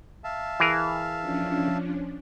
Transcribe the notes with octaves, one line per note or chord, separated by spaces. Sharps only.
E5 F5 A5
E3 G#4 A#4 F6
F3 C#4 D4